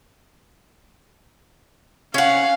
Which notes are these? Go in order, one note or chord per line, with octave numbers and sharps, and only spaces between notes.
C#4 F5 F#5